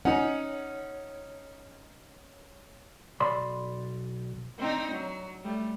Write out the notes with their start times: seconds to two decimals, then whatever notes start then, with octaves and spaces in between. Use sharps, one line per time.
0.05 C#4 D#4 F#5
3.20 B1 D5 B5 C6
4.58 C4 D4 D#4
4.92 F#3
5.44 G3 A3